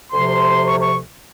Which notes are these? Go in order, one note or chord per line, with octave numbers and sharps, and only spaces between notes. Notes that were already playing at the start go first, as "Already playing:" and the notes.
D2 C3 F3 C6
C#6
C#6